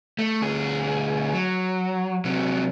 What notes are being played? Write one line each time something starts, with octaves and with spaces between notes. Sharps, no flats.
A3
D2 G#4
F#3
C3 F#3